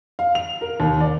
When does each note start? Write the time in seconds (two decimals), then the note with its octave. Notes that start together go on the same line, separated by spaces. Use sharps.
0.19 F5
0.35 F7
0.61 A#4
0.80 D#2
1.00 D5